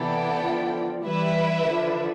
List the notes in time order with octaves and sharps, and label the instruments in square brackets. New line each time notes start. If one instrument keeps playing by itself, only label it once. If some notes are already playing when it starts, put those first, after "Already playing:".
Already playing: [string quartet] C3 E3 [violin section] B3 E4 A4 D5 G5
[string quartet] D3 F3
[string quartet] E3 G3 [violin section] E4 B4 E5
[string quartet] D3 F3